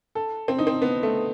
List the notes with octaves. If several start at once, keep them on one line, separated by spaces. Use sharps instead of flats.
A4
C4
D#4
C4
B3
A3